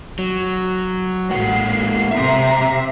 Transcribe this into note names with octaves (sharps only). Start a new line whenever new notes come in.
F#3
A1 G#3 A#3 F#5 C7
C3 E5 A#5 C7